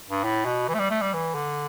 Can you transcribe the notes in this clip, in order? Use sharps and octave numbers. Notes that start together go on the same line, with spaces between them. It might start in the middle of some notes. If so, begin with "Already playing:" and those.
G2
A2
B2
E3
A3
G3
A3
G3
E3
D3